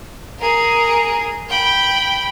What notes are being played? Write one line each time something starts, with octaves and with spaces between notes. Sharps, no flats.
G#4 A#4
G5 B5